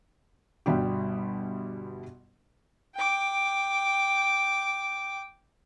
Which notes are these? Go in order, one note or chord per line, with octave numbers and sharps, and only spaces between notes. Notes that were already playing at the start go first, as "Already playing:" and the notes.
G1 B2 G3 G4
G5 D6